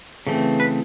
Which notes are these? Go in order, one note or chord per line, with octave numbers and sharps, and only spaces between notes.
C#3 E3 A3 C4
B4